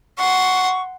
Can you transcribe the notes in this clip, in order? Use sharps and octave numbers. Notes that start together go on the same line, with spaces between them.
F#5 C6 C#6